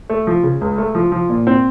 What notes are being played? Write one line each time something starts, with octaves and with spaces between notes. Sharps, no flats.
A3
F3
C#3
C#2
A3
F3
F3
A#2
C4